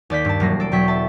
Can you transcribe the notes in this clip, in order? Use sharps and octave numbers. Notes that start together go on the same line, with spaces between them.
D#2 D5 G6 B6
G2 A5
E1 F#3 G3 A#3 A#6 C7
A4 D7
E2 B2 F#3 G5 C#6 B6
E5 A5